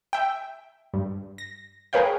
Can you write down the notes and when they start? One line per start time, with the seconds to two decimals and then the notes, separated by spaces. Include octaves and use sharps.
0.13 E5 G5
0.94 G2
1.38 A#6
1.93 G#4 A#4 B4 C#5 F5 G5